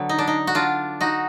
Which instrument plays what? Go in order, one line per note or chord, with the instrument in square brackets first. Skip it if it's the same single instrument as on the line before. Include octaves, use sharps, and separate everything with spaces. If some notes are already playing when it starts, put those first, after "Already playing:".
Already playing: [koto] D3 F#3 B3
D#4
D4
D#4
F#4
D4 F4
D#4 F#4